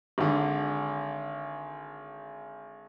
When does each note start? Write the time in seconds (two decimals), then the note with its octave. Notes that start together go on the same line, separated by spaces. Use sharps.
0.18 G#1 D3